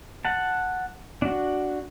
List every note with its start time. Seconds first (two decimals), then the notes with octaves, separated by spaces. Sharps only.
0.25 F#5 A5
1.22 D4 F#4